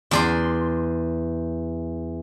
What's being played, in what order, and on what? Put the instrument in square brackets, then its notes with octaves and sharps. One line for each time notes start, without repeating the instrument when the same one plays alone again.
[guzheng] E2 D5 C6